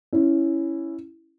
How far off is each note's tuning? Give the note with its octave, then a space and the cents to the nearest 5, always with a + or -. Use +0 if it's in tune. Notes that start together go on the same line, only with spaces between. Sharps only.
C#4 +0 E4 +0